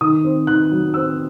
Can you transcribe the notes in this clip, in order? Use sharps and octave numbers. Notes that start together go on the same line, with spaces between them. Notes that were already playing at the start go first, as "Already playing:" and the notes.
D#3 D#6
C4
D#3 F#6
F#3
C4 E6